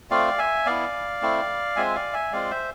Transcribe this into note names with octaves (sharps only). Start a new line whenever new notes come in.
A3 C4 F4 D5 F5
E5 G#5
B3 E4 D5 F5
A3 C4 E4
G#3 C4 F4 E5 G#5
D5 F5
E5 G#5
G#3 C4 F4 D5 F5
C5 E5